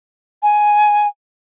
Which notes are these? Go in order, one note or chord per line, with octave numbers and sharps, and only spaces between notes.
G#5